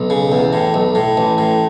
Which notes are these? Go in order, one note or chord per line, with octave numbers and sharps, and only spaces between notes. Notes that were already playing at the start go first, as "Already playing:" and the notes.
Already playing: B1
C#3
E2
A2
B1
A2
A1
A2